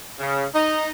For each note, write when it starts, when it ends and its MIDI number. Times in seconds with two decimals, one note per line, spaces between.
0.20 0.45 49
0.55 0.90 63